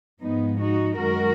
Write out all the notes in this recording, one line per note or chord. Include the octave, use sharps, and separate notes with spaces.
G#2 F3 G#3 B3 D#4
D#4 F#4
F#2 D#3 G#3 F#4 A#4